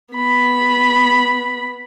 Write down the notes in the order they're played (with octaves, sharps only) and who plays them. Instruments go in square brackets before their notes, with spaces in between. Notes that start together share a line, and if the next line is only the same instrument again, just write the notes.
[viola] B3 B5